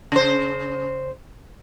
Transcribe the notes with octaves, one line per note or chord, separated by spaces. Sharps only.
C#3 C5